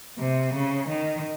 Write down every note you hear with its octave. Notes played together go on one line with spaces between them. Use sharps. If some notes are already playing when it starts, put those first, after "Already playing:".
C3
C#3
D#3